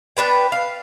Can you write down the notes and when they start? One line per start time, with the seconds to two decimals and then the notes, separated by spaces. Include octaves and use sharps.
0.17 B3 D4 B4 G5
0.52 F5